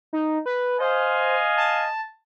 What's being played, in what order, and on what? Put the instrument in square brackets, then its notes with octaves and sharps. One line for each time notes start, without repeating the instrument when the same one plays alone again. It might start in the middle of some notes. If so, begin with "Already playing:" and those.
[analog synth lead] D#4
B4
[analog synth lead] C5 [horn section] D#5 F5 G#5
[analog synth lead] A5